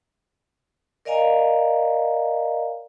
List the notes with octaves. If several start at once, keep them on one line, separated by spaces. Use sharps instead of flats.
A#4 D5 D#5 F5 G#5 A#5